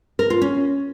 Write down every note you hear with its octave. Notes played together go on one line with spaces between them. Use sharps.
A#4
F4
C#4